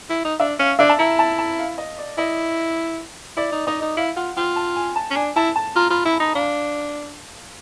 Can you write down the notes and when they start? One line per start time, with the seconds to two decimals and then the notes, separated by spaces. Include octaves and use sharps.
0.09 E4
0.24 D#4
0.40 D4 E5
0.59 C#4 F5
0.79 D4 E5
0.89 A5
0.98 E4 A#5
1.19 A5
1.39 A5
1.59 F5
1.78 D#5
1.98 D5
2.18 E4 D#5
3.37 E4 D5
3.52 D#4
3.67 D#4 D#5
3.82 D#4
3.97 E4 F5
4.16 F4 F#5
4.37 F4 G5
4.56 A5
4.76 G#5
4.96 A5
5.11 C#4
5.16 D4 G#5
5.36 E4 A5
5.56 A5
5.75 F4 A#5
5.90 F4 B5
6.05 E4 B5
6.20 D#4 A#5
6.35 D4 F5